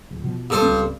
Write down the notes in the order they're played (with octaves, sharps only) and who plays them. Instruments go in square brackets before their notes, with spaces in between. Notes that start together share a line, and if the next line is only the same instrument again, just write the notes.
[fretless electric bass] D1
B2 F3
[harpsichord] G2 A4 C5
[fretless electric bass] C#2 C4